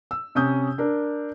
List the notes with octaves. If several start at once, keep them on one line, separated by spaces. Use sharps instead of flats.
E6
C3 C#4 D#6 G6
D4 A#4